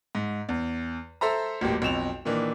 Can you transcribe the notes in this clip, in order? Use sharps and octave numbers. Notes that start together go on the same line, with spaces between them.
G#2
E2
A4 C5 E5 A#5
E1 A1 A#2 G4
B1 F2 E7 F7
A#2 D#3 E3 D4